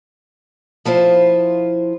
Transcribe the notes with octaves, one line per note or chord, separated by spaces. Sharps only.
F3 E4 F4 C5